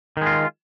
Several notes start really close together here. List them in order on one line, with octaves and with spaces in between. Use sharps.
D#3 G#3 F4